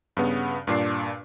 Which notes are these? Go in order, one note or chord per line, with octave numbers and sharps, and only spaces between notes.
G2 C#3 B3
G2 A#2 D4 C7